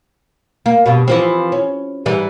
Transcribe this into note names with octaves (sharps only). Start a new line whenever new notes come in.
A#3
G2 B2
E3 F3 C4
C#4
G#2 E3 G3